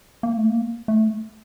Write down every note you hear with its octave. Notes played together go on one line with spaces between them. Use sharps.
A#3
A3
A#3
A3